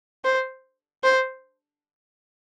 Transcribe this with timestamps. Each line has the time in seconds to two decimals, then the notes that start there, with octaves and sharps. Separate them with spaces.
0.24 C5
1.03 C5